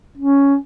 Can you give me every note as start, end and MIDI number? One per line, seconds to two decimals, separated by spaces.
0.18 0.56 61